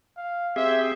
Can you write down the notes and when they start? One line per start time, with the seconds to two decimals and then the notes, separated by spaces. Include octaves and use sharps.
0.17 F5
0.56 C4 G4 G#4 E5